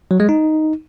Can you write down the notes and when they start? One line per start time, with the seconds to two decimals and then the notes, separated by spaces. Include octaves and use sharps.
0.11 F#3
0.20 G#3
0.29 D#4